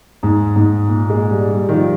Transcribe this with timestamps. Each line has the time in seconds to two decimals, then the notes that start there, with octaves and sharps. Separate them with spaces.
0.23 G#2
0.56 G#2
0.88 A#2
1.10 G#3
1.31 G3
1.52 G3
1.69 D#3
1.73 F3